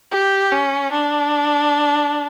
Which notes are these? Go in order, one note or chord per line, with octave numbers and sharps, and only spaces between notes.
G4
C#4
D4